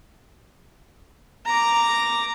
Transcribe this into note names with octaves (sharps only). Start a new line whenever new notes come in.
A#5 D6